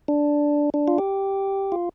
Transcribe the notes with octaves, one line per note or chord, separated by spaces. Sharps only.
D4
D4
F4
G4
F4